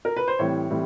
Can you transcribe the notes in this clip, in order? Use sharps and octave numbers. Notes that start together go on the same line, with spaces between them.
A#4
B4
C5
A2 E3 G3 C4 C#5
A2 E3 G3 C4